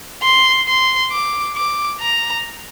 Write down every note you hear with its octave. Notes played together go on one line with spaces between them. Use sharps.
C6
C6
D6
D6
A#5